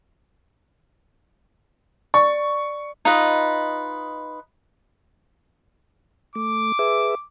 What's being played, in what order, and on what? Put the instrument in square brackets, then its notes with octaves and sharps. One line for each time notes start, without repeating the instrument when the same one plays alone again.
[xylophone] D5 [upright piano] C#6
[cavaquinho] D#4 F4 B4 D#5
[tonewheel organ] A3 [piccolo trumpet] D6
[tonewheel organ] G#4 B4 E5